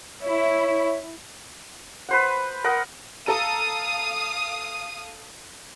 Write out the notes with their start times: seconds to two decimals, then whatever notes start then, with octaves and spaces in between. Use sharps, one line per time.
0.23 E4 C#5
2.09 B4 C5 F#5
2.64 A#4 D#5 F#5
3.26 A4 F5 A#5 D#6 D#7